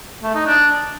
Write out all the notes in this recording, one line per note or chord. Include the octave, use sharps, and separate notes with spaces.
A3
D#4
D4